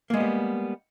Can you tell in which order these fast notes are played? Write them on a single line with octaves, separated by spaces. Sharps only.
A#3 G#3 B3 G3